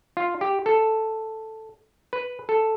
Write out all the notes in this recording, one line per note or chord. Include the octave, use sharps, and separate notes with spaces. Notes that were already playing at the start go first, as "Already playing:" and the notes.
F4
G4
A4
B4
A4